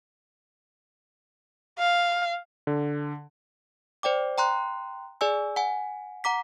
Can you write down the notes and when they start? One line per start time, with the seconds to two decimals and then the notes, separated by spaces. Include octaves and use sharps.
1.79 F5
2.67 D3
4.03 C5 D5 G5 D6
4.38 G5 A#5 C6 F#6
5.21 G#4 D5 G#5 E6
5.56 F#5 G#5
6.24 F#5 A#5 D6 B6